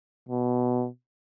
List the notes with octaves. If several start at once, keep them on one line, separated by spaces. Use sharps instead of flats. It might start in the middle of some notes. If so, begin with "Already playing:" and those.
B2